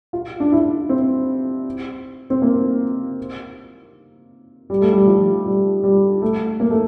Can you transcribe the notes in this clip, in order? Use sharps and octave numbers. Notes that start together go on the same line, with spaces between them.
F4
D4
E4
C4
C4
A#3
G3
A3
G3
F3
G3
G3
A3
A#3
A3